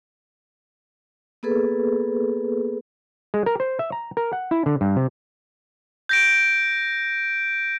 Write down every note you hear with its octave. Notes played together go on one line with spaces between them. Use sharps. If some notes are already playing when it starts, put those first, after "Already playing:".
A#3 B3 G#4 A4 B4
G#3
A#4
C5
E5
A#5
A#4
F#5
E4
D3
G2
C3
G6 A#6 D7